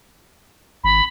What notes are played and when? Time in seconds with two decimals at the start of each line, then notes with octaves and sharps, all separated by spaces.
0.84 G#1 B5